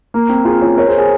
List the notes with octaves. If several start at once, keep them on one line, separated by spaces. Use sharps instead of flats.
A#3
C4
F4 G#4
C#4 F4
A#4 C#5
G#4 C5
G#4 C5